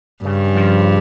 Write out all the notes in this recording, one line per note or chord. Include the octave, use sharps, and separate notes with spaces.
G2 C#3
F3